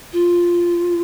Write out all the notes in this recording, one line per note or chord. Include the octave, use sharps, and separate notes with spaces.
F4